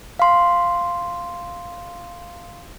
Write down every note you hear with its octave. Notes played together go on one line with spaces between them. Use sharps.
F5 C6